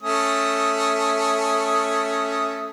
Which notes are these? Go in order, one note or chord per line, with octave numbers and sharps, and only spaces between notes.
A3 C#4 D#6